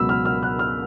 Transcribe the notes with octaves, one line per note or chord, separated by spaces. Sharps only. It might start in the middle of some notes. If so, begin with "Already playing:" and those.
Already playing: C#2 B2 F#3 B5 E6
F6
F6
F#6
F6